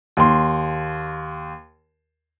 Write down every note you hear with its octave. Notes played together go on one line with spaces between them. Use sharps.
D#2 C6